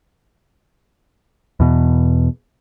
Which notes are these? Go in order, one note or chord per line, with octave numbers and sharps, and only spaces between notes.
E2 B2